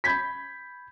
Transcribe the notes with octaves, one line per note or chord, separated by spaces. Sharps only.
B5 G6 G#6 B6